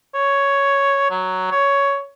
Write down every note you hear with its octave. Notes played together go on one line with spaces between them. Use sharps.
C#5
F#3
C#5